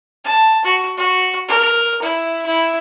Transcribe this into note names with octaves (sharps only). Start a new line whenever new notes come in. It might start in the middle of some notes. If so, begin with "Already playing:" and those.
A5
F#4
F#4
A#4
E4
E4